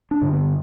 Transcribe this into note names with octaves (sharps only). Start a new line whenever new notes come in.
D4
G2 D3
B3